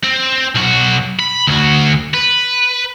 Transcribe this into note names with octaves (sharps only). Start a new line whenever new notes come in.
C4
B1 F#4
B5
D2 F#4
B4